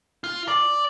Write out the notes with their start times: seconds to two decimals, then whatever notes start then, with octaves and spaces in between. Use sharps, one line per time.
0.24 F4
0.48 D5